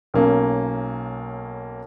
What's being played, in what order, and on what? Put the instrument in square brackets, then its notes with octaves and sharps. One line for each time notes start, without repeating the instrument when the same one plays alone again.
[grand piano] B1 A#3 C#4